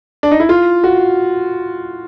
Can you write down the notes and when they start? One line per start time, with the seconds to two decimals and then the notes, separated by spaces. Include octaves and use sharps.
0.23 D4
0.31 D#4
0.40 E4
0.49 F4
0.84 F#4